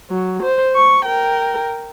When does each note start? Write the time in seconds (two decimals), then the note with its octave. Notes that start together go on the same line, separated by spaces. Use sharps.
0.10 F#3
0.43 C5
0.76 C#6
1.05 A#4 G5